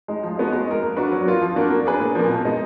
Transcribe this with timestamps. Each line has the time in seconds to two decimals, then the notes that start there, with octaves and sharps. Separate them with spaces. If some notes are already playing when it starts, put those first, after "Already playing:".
0.08 G#3 D#4
0.23 F3
0.38 G#3 B3 D#4 F#4
0.53 G#3
0.67 D#4 A#4
0.82 A#3
0.97 D4 F#4 B4
1.12 F#3
1.26 A#3 F4
1.41 F3
1.56 A#3 D4 F#4 A#4
1.70 A#3
1.85 D4 G#4 B4
2.00 A#2
2.15 F3 A#3
2.29 B2
2.45 G#3 D#4